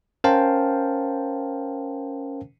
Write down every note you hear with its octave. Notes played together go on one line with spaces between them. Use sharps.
C#4 A#4 C5 F5 G5 A5